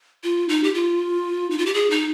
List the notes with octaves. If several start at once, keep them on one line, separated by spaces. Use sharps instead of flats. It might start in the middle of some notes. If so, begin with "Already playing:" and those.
F4
D#4
G4
F4
D#4
F4
G4
G#4
D#4